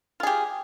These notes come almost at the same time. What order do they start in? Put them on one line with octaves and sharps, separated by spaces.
F4 G#4 G4